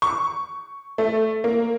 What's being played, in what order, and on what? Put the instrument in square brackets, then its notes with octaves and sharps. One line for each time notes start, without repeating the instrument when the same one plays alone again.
[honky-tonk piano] C#6
A3
A#3